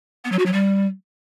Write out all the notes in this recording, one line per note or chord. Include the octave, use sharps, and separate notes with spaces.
B3
F#3
F#4
F#3
G3